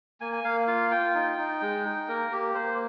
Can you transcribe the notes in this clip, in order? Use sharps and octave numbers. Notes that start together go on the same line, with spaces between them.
A#3 G#5
G#5
A#3 F5
F4 F5
F4 G5
D#4
D#4
G#3
D#4
A#3 A#4
A#3 G4
A#3 C5